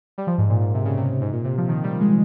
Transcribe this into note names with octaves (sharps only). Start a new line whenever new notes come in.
G3
F3
G#2
A#2
A#2
C3
C#3
C3
G#2
A#2
C3
F3
D#3
G3
G#3